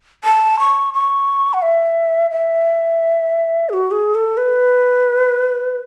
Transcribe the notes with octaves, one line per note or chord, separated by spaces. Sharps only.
A5
C#6
C#6
F#5
E5
E5
G#4
F#4
G#4
A4
B4